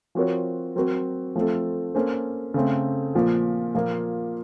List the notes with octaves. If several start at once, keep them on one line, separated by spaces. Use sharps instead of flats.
F3 C4 F#4 A#4 C#5
F#3 C4 F#4 A#4
F3 A3 C4 F4 A4
A#3 C#4 A4 C5
C#3 A3 C4
A#2 F3 A#3
A#2 F3 A#3